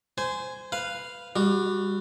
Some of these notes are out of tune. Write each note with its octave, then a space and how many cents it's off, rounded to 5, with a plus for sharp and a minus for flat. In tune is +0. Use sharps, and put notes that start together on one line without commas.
C5 -20 G#5 +0
B4 +0 F5 -5
G3 +25 F#4 +0